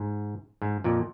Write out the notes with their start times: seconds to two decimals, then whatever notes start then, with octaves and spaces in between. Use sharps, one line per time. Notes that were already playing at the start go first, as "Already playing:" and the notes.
Already playing: G#2
0.62 G#2
0.84 F2 A#2